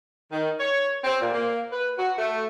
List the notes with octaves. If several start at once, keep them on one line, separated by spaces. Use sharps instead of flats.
D#3
C#5
C4
A#2
A#3
B4
F#4
A3